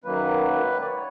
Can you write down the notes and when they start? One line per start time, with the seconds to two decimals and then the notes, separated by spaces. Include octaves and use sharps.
0.04 F#2 D#3 F#3 A#3 B4
0.81 D5
0.86 C#5